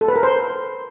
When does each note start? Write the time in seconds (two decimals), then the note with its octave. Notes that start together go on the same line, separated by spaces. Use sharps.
0.01 A4
0.08 B4
0.16 A#4
0.23 C5